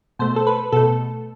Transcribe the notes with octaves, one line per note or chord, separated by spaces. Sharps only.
B2 A3 C5
A4
B4
B2 A3 A4